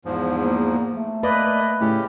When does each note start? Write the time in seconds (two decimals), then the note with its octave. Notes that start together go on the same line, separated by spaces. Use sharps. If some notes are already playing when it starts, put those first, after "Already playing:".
0.05 E2 G#2 F3
0.41 A#3
0.96 A3
1.23 A#3 B4 D5 D#5
1.81 A2 C#3 C#4 G4